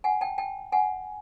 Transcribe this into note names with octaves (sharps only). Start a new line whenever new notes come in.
F#5 G#5
G5 A5
G5 A5
F#5 G#5